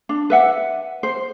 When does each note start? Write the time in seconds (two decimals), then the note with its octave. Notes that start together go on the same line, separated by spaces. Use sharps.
0.09 D4
0.30 B4 E5 F#5
1.03 C5